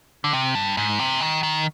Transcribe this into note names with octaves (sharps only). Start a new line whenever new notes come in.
D3
C3
G2
G#2
C3
D#3
D#3